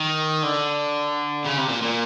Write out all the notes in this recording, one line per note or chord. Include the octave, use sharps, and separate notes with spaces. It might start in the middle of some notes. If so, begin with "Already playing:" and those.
Already playing: D#3
D3
C#3
C3
A#2
A#2